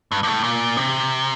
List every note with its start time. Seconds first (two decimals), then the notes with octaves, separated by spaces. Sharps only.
0.12 G2
0.23 G2
0.27 A2
0.44 A#2
0.77 C3